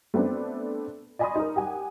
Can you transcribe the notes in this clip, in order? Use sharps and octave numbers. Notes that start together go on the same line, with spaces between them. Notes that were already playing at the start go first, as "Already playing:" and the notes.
A3 B3 C4 D4
D5 D#5 G#5 B5 C6 D#6
D#4 A#4
G4 F#5 G#5